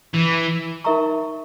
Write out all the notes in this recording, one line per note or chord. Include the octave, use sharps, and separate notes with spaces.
E3
D#4 A#4 E5 A#5 C#6